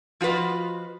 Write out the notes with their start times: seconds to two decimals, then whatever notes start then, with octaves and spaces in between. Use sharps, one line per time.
0.21 F3 F4 F#4 B4 D#5